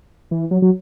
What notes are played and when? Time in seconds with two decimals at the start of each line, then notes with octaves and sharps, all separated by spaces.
0.31 E3
0.51 F#3
0.62 F#3